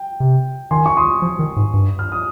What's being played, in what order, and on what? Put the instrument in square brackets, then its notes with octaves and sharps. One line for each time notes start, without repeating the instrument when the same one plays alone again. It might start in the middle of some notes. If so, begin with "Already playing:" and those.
Already playing: [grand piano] G5
[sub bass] C3
[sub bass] D#3 [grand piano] G#5 C6
[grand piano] C#6
C6 D#6
[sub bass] F3
D#3
G#2
G2
[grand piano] F6
D#6